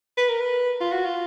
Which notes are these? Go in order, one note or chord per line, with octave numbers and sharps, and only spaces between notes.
B4
A#4
B4
F4
F#4
F4